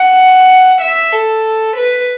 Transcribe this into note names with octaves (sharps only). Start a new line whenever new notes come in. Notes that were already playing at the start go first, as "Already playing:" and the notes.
Already playing: F#5
E5
A4
B4